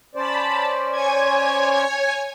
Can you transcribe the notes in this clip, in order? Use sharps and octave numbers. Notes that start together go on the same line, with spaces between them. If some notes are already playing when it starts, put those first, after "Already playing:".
C#4 C5 D5 A5 B5
C#5 G#5 G#6